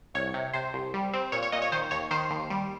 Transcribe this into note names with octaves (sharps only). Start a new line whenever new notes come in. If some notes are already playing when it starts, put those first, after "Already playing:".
C2 C#5
C3
C3 C5
C2
G3
C4
A#2 C#5
C#5
A#2 D#5
C#5
D#3 C5
D#2 C#5
D#3 C5
D#2
G3